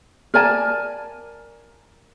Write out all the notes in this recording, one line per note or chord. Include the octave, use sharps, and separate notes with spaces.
A#4 D5 G#5 A5